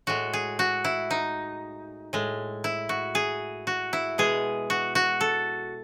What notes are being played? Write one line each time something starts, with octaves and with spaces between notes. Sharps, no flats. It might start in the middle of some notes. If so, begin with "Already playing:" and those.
A2 G#3 F#4
G#4
F#4
E4
D#4
A2 G#3
E4
F#4
G#4
F#4
E4
B2 G#3 G#4
F#4
F#4
A4